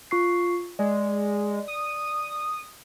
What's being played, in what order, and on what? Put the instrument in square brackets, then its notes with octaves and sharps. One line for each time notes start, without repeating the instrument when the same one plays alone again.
[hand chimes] F4 C#6 C7
[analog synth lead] G#3 [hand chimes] D5
[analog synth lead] D#6